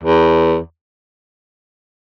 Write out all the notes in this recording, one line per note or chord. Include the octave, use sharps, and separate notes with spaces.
E2